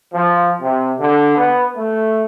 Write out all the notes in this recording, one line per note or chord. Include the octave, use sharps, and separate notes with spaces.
F3
C3
D3
B3
A3